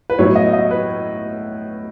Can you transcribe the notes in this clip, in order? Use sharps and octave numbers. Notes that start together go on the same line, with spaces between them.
B4
A2 F#3 B3 E4 C#5
D#5
D#5
B4